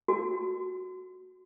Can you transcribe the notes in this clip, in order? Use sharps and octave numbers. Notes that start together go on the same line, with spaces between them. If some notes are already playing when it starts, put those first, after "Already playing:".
F#4